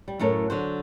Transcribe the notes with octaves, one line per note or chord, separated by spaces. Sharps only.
G3
F#2 A2 A4 A#4 C#5
D3 F#3 C5